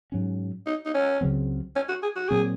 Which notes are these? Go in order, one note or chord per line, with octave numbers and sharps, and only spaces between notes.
G#2 F#3 C#4
D#4
D#4
C#4
C#2 C#3 F#3 C4
C#4
F#4
G#4
F#4
A#2 F#3 C4 G#4